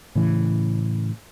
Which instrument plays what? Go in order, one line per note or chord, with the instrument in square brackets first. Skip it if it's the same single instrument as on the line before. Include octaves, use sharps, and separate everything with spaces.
[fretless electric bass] A2 C#3 E3